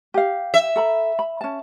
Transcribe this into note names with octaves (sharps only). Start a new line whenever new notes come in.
G4 F5
E5
A4 A#5 B5
B5
C#4 A5